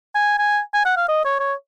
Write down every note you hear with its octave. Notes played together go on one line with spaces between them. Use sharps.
G#5
G#5
G#5
F#5
F5
D#5
C#5
C#5